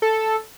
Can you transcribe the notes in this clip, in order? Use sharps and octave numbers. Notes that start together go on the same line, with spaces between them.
A4